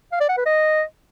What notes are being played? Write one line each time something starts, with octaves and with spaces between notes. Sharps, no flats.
F5
D5
F#5
B4
D#5